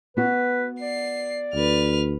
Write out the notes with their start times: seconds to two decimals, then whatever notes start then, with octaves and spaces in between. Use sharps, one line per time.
0.17 B3 F#4 B4
0.81 D5 C7
1.55 D2 B4 F6